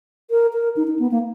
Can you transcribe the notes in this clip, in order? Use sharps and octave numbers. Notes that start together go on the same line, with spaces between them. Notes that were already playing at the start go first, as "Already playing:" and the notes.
A#4
A#4
D#4
D#4
B3
A#3